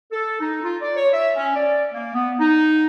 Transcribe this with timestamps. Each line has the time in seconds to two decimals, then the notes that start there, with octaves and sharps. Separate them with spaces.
0.12 A4
0.40 D#4
0.63 F4
0.82 D5
0.96 C#5
1.12 E5
1.36 C#4
1.56 D5
1.93 A#3
2.14 B3
2.40 D#4